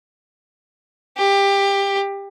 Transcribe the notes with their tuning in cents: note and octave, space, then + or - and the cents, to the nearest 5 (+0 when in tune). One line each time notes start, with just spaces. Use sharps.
G4 +20